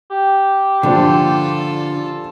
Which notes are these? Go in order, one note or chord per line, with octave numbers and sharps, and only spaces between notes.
G4
G2 A#2 D3 F3 F4 A4